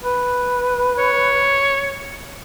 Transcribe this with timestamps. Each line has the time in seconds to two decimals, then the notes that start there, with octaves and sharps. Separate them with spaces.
0.03 B4
0.98 C#5